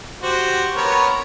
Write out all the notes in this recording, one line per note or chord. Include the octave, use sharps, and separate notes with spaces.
F#4 G4 C5
B3 A#4 C#5